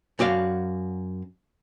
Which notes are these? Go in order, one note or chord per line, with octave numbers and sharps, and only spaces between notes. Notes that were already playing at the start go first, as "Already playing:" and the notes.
F#2 F#4 D5 F5